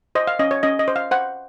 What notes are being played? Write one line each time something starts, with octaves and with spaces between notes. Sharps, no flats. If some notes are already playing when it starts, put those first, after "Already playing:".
C5 D#5
F5
C#4 D#5
C#5
C#4 D#5
D#5
C5
F5
C5 F#5